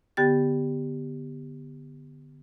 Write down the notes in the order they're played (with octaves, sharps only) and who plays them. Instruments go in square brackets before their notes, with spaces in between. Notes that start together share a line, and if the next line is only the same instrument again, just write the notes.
[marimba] D3 B3 G4 G5 A6